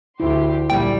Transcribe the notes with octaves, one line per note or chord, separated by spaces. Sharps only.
D2 D3 E4 G4 C6
A#1 F#3 G3 A#3 G5